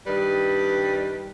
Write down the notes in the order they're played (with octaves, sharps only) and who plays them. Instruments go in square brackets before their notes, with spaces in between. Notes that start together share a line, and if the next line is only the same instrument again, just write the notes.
[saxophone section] G2 D#3 G3 B4